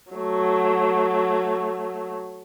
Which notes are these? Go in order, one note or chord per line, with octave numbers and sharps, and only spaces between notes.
F#3 A3